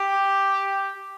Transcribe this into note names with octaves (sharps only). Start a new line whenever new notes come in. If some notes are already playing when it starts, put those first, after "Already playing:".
Already playing: G4